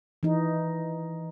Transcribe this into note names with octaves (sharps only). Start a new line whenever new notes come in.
E3 D#4